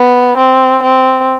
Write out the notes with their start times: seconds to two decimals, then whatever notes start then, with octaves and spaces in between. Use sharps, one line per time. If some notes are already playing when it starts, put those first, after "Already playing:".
Already playing: B3
0.37 C4
0.83 C4